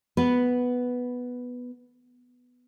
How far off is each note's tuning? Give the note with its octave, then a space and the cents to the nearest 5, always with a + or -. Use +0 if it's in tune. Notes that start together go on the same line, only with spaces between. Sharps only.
B3 +0 B4 +0